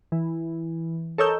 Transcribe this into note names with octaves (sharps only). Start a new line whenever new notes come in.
E3
A4 A#4 C#5 D#5 E6 G6